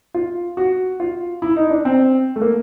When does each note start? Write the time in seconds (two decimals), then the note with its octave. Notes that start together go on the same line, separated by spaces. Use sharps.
0.14 F4
0.57 F#4
1.00 F4
1.42 E4
1.56 D#4
1.70 D4
1.85 C4
2.36 A3
2.42 A#3